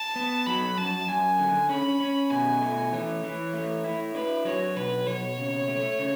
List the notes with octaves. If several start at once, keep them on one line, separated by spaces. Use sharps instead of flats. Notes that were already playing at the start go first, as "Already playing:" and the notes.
Already playing: A5
B3
F#3 B5
F#2 A5
F#2 G#5
D3
C#4 B5
C#4
B2 G#5
A3
E3 C#5
E3
A3
E4
D4 B4
F#3 C#5
B2 B4
B2 C#5
C#3
A3
C#3